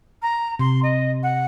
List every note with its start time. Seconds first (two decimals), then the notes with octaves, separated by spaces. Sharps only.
0.22 A#5
0.59 C3 C6
0.83 D#5
1.23 F#5